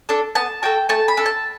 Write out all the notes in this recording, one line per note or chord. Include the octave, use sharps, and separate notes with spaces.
D4 A4
B3 A5
F#4 A4 G5
A3 A5
B5
D4 A4
A5